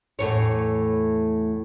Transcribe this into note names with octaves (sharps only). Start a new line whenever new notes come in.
E2 A2 C#5